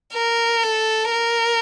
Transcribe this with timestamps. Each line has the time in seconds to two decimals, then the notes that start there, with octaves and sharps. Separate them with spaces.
0.14 A#4
0.63 A4
1.11 A#4